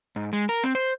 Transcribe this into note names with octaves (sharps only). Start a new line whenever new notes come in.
G#2
G#3
A#4
C4
C5